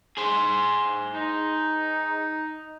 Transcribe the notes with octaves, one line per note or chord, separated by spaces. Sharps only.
G#4 C5
D#4